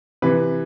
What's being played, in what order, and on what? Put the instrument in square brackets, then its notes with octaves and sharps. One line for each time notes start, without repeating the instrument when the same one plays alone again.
[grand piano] C3 E3 B4